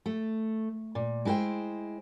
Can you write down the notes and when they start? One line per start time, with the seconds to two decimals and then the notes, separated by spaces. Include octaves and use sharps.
0.06 A3
0.95 A#2
1.25 G#3 E4 F#4 C5 G5